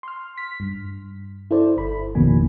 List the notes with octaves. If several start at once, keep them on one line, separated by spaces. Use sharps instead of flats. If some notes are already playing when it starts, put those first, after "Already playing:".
C6 F6
B6
G2
E4 A4 C5 D5
G1 B5
A1 F2 B2 D#3 A#3 G#5